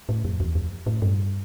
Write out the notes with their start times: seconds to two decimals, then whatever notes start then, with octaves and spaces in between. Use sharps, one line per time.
0.09 A2
0.25 F2
0.40 E2
0.55 F2
0.86 A2
1.02 G2